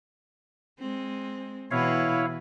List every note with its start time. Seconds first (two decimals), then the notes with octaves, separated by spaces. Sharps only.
0.79 G#3 C4
1.71 B2 E3 E4 B4 C#5 F5